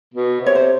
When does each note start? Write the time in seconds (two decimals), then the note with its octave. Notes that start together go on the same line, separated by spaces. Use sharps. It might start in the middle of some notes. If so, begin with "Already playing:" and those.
0.14 B2
0.41 C3
0.46 C#5
0.55 C5